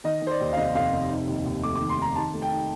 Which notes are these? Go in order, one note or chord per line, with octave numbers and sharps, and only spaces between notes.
D#3 D#5
D#3
C5
D5
D#2
F5
F1 D#5
F1 F5
F1
D#4
D#2
D#2
A3 D6
D#3 D6
C6
D#4 A#5
D#3 A5
A3
G5
D#4